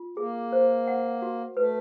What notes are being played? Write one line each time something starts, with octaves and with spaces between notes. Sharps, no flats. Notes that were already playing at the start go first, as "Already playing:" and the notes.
Already playing: F4
A#3 G#4
C5
F#5
F#4
A3 B4